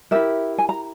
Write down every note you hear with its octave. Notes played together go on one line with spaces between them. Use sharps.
E4 G4 A#4 E5
G#5
A#5